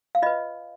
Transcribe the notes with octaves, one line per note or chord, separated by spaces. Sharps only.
F5
F4 B4 D#5